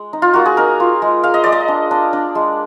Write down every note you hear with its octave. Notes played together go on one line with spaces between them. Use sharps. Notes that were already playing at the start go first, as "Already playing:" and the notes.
Already playing: G#3
D#4
F4
A#3 F#4
G#4
D#4 A#4
F4
G#3
G#3 F5
D#5
G#3 D5
D#5
D4
D4
D4
G#3